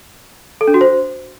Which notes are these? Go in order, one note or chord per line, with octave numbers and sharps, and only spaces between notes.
A4
D4
F#4
C5